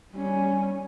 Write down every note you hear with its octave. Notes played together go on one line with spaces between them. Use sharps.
G3 C#4